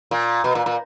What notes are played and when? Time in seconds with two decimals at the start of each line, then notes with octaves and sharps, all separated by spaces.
0.11 A#2
0.44 B2
0.55 A#2
0.66 A#2